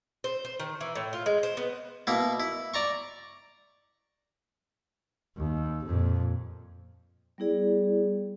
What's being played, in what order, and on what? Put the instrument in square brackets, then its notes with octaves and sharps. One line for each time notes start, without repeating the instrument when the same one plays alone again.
[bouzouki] C5
C5
D#3
E3
A2
F4
G#3
C5
B3
[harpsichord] B2 A#3 E4
E4
D5 A#5 C#6
[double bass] D#2
F2 A#2
[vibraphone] G3 B3 E4 G#4 D5